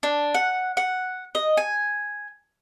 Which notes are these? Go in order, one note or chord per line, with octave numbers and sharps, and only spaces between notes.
D4
F#5
F#5
D#5
G#5